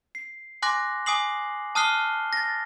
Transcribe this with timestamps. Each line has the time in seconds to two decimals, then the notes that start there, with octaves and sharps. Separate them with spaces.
0.15 C7
0.62 G#5 C6 D6 F#6 A#6
1.06 G#5 D6 D#6 C7 F#7
1.75 A5 D#6 F6 F#6 C7 G7
2.33 A6 A#6